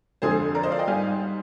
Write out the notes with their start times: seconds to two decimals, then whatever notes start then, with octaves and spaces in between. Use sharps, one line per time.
0.22 F2 D3 F3 G#3 G#4 C5
0.55 A#4 D5
0.63 C5 D#5
0.71 D5 F5
0.79 D#5 G5
0.87 G#2 G3 F5 G#5